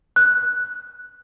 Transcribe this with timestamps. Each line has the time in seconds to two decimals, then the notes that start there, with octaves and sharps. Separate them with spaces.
0.16 F#6